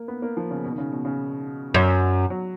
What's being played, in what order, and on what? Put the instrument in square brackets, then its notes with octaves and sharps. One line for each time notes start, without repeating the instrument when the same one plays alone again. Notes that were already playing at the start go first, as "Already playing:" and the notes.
Already playing: [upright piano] A#3
B3
A#3
F3
C#3
B2
D#3
C#3
B2
C#3
[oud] F#2
[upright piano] F#3